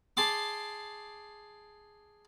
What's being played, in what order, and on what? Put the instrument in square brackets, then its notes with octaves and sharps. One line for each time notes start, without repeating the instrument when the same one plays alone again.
[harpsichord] G#4 A5 C6 D6